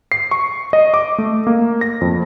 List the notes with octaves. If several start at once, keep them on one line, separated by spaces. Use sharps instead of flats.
C7
C#6
D#5
D6
A3
A#3
A#6
F2